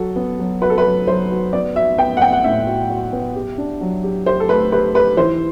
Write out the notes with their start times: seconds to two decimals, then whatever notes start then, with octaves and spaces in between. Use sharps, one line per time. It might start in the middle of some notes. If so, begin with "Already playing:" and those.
Already playing: F#3 F#4 A4
0.16 B3
0.39 F#3
0.61 F#4 B4
0.70 A4
0.78 B4
0.85 F#3
1.07 F#3 C5
1.30 F#4
1.53 B3 D5
1.75 F#4 E5
1.98 B3 G5
2.17 F#5
2.21 B3 G5
2.33 F#5
2.44 A2 E5
2.66 F#4
2.90 F#4
3.13 B3
3.36 G4
3.58 D4
3.81 F#3
4.04 G4
4.26 G4 C5
4.40 A4
4.49 A3 B4
4.72 G4 B4
4.94 G4 B4
5.17 E3 C5